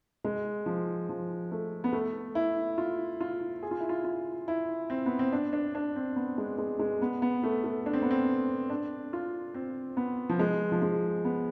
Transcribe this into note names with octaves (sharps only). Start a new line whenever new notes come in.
G#3
F3
F3
A3
B3
A3
E4
F4
F4
G#4
F4
E4
F4
F4
E4
C4
B3
C4
D4
D4
D4
C4
B3
G#3
G#3
G#3
B3
B3
A3
A3
D4
C4
B3
C4
D4
F4
C4
B3
F3
G#3
F3
G#3
B3